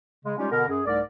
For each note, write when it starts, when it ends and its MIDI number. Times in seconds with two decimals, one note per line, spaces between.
0.25 0.34 49
0.25 0.34 56
0.38 0.46 55
0.38 0.46 56
0.38 0.46 61
0.38 0.46 63
0.38 0.46 65
0.38 0.46 67
0.51 0.63 47
0.51 0.63 50
0.51 0.63 59
0.51 0.63 70
0.68 0.80 42
0.68 0.80 68
0.86 1.00 36
0.86 1.00 44
0.86 1.00 57
0.86 1.00 70
0.86 1.00 74